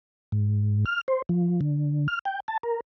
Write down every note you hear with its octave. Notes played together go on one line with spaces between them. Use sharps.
G#2
F6
C5
F3
D3
F6
G5
A5
A#4